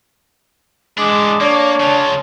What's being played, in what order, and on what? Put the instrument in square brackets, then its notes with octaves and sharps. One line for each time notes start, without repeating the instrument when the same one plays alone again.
[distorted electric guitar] E3 D4 [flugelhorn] G#3 [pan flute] D6
[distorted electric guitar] A#3 [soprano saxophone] D4 [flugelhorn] C#5
[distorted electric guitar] C#3 F4 [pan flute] A5